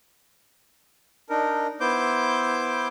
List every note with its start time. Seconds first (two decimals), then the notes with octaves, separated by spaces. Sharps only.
1.30 D4 D#4 A#4
1.80 B3 E4 C5 D6 G6